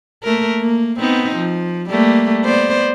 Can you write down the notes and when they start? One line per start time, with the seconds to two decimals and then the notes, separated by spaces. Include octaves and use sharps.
0.23 A3 A#3 A#4
0.60 A#3
0.99 B3 C4 D#4
1.36 F3
1.90 G3 A3 A#3
2.44 B3 C5 D5